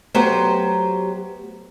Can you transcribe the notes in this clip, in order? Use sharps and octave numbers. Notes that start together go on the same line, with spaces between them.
F#3 A3 B3 G4 C5